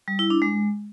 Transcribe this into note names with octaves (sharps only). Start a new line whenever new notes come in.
G3
E4
D4
G#3